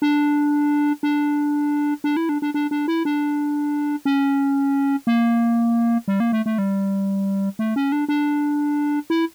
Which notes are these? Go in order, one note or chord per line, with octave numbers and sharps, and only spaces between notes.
D4
D4
D4
E4
D4
D4
D4
D4
E4
D4
C#4
A#3
G3
A#3
A3
A3
G3
A3
C#4
D4
D4
E4